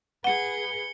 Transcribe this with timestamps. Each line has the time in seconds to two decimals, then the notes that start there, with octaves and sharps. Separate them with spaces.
0.24 G#4 B4 F#5 C#7 G7